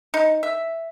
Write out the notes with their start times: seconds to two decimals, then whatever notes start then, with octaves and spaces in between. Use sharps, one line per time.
0.14 D#4
0.43 E5